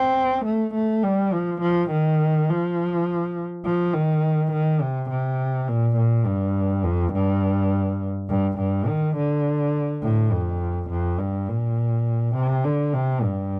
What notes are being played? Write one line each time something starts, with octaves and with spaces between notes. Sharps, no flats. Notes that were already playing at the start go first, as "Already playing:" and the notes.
Already playing: C4
A3
A3
G3
F3
F3
D#3
F3
F3
D#3
D#3
C3
C3
A#2
A#2
G2
F2
G2
G2
G2
D#3
D3
A2
F2
F2
G2
A#2
C3
D3
C3
G2